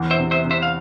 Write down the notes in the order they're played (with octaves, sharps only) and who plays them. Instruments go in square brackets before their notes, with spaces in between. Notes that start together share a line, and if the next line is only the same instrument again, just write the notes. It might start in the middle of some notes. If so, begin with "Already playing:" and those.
Already playing: [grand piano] E2
[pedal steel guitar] C5 E5
[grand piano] C3
[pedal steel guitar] C5 E5
[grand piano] C3
[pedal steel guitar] C5 E5
F5